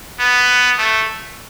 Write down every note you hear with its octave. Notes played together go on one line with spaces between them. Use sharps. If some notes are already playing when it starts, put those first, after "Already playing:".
B3
A3